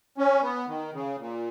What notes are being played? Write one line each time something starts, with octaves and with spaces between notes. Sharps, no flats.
C#4
B3
D#3
C#3
A#2